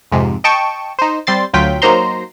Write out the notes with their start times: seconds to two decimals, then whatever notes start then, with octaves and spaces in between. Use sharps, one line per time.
0.12 F2 G#2 C3
0.44 D#5 G5 A5 C#6
0.99 D#4 C5
1.27 G3 C4 C6 A6
1.53 D2 F#3 F4 G5 B6
1.82 F#3 A#3 D#4 C5 A#5 C6